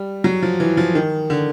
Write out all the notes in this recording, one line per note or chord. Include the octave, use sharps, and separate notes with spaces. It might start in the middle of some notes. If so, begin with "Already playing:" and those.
Already playing: G3
F#3
F3
E3
F3
D#3
D3